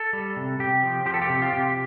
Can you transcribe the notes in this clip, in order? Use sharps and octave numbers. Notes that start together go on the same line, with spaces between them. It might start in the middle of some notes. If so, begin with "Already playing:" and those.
Already playing: A4
G3
C3
C3 G4
F3
F3 G4
A4
G4
C3
F4
C3 G4